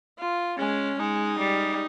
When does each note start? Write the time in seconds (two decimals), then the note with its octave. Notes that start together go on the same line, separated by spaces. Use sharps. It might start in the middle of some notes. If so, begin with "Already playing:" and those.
0.18 F4
0.58 G#3 C#4
0.99 G#3 D#4
1.39 G3